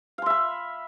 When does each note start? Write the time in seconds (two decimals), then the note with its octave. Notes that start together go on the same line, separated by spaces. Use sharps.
0.18 F5
0.22 C6
0.26 E5
0.30 B5